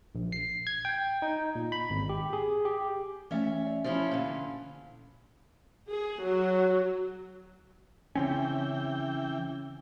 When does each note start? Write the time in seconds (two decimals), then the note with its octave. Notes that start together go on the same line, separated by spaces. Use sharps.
0.15 A#1
0.32 C7
0.67 G#6
0.85 G5
1.22 D#4
1.55 A#2
1.72 B5
1.90 G#1
2.09 G4
2.33 G#4
2.65 G4
3.31 E3 A3 C#4 E5
3.67 D5
3.84 F3 C#4 E4
4.11 A#2 D3
5.88 G#4
6.21 F#3
8.15 C#3 E3 C4 C#4 G5